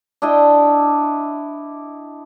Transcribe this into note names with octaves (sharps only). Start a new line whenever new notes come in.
D4 E4 D#5 G5